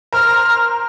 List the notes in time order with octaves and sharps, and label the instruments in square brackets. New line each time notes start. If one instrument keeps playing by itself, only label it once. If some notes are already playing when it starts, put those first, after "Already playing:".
[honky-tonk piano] A#4 C5 [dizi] F6